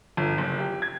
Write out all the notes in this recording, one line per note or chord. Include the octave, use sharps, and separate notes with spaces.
G1
F#1
G4
G#6